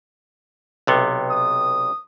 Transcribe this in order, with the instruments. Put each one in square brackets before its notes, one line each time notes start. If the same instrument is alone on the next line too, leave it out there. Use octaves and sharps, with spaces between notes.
[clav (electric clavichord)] B1 C3 B3
[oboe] D#6